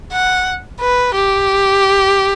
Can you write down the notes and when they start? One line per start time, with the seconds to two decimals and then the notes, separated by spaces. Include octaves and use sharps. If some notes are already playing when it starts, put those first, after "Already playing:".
0.12 F#5
0.80 B4
1.15 G4